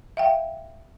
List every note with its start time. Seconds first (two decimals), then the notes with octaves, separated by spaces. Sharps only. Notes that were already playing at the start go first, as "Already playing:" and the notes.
0.17 E5 F5 G5